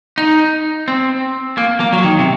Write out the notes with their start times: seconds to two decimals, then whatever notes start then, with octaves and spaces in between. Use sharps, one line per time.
0.18 D#4
0.88 C4
1.58 A#3
1.80 A#3
1.93 F#3
2.04 D#3
2.19 C3